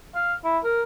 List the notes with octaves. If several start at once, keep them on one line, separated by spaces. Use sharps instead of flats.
F5
E4
A#4